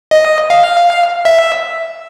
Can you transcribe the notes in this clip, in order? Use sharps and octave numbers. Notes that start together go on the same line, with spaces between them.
D#5
F5
E5